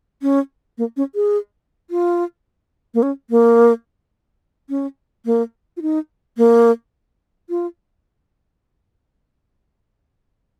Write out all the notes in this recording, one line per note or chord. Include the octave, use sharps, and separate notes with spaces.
C#4
A#3
C#4
G#4
F4
A#3
C#4
A#3
C#4
A#3
F4
D#4
A#3
F4